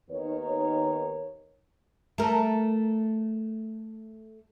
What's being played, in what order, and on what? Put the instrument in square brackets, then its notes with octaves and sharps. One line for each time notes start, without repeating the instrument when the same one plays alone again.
[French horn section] D#2 D#3 B3 D#4 A#4 C#5
[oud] A3 A#4